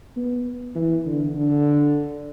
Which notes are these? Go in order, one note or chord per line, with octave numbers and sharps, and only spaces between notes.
B3
E3
D3
D3